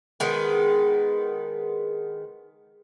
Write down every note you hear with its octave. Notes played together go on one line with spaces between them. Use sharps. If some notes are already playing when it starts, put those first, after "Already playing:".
D#3 G#3 B3